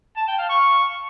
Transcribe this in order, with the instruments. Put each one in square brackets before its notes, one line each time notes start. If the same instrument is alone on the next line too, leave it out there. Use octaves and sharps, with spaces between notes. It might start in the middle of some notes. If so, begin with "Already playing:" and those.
[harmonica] A5
G5
F5
C#6